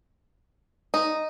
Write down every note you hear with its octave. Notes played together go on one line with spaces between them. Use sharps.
D#4